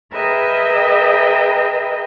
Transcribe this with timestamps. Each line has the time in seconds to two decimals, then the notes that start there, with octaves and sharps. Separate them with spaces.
0.13 G#4 A#4 B4 D#5 E5 G5